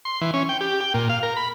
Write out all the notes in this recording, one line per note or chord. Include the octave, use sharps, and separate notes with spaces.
C6
E3
C#4
G5
G4
G5
A#2
F5
A#4
B5